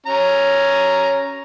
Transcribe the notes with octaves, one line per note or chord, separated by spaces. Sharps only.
C#4 A#5